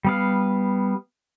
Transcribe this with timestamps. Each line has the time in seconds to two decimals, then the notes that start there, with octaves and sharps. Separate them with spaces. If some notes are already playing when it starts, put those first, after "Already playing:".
0.05 G3 B3 F5